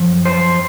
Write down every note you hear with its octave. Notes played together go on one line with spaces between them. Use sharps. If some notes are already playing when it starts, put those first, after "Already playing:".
Already playing: F#2 F3
C5